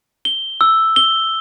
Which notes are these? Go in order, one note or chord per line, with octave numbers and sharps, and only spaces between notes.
G7
E6
G7